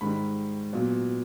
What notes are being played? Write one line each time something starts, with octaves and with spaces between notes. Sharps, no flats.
G#2 D#3 G3 B5
A#2 F#3 B3